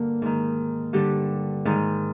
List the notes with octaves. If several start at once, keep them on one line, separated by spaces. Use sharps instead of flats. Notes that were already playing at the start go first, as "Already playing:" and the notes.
Already playing: G2 D3 A#3 A#4
G#2 D#3
G2 D3 G3 G4
G#2 D#3